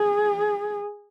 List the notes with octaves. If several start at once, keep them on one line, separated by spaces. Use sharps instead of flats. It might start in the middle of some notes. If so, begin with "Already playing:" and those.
Already playing: G#4